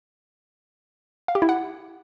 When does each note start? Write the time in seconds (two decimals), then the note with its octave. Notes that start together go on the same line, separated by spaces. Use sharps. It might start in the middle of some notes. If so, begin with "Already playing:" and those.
1.28 F5
1.35 G4
1.42 E4
1.49 F#5